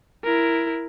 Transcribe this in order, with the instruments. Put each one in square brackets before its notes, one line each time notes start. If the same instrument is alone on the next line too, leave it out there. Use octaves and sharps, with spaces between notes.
[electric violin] E4 A#4